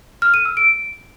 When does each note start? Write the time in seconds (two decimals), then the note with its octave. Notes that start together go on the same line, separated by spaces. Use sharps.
0.22 F6
0.34 D#7
0.45 E6
0.57 D7